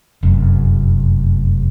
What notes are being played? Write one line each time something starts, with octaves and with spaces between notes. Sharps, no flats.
F1 F#2